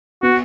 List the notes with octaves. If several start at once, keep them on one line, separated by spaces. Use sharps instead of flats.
B3 F#4